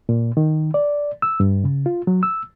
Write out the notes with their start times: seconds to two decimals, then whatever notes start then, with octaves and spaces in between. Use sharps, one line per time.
0.09 A#2
0.37 D#3
0.74 D5
1.22 E6
1.40 G2
1.64 C#3
1.86 F4
2.07 F#3
2.23 E6